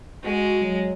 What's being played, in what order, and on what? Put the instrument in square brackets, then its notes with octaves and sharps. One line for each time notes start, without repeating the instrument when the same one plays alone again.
[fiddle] G#3 [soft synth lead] F#4
[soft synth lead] F#3